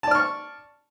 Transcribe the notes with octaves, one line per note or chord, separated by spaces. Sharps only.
D5 A5 C#6 F6